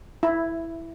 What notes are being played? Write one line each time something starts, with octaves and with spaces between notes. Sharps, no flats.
E4